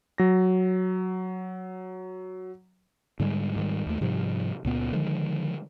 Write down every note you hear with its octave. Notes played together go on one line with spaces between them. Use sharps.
F#3 A#6
G#2 D3 G3 G#3
G#2 D#3 G3
D#2 A3
G#2 C3 F3 G3
C#2 A#2 B3
D3 D#3 F3 G#3